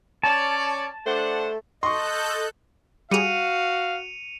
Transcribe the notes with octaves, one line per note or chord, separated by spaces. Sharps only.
C#4 C#5 D5 A5
A3 D4 C5 F#5
A4 D#5 C6 C#6 F#6 G6
G3 F#4 G#4 F5 C#7 D#7 F7